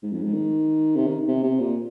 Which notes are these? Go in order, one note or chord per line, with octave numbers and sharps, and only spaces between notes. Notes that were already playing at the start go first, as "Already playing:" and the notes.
G#2
F2
G#2
D#3
C3
D#3
C3
C3
A#2